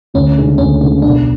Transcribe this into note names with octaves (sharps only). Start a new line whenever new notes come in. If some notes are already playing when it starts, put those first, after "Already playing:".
D2 C#4
C#3 G#3 D4
D2 C#4
C#3 G#3 C#4 D4
B1 D4